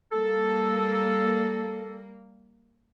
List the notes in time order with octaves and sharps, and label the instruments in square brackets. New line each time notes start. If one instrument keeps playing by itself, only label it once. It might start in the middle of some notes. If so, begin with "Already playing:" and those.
[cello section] G3 A#3 [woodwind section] A4